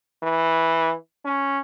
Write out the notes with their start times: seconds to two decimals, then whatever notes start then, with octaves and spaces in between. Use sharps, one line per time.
0.23 E3
1.25 C#4